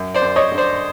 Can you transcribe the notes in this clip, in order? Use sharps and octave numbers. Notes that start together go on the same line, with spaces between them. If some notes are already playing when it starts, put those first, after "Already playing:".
Already playing: F#2
C5 D5
F#2
C#5 D#5
D3
C5 D5